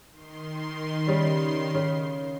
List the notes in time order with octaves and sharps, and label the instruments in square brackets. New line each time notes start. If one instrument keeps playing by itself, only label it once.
[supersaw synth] D#3 C6
[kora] C#3 G3
C#3